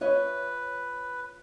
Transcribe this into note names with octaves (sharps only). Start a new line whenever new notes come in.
F4 B4 C#5 D#5